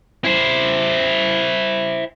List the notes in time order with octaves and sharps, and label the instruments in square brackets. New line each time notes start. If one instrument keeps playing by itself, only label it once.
[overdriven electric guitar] E4 C5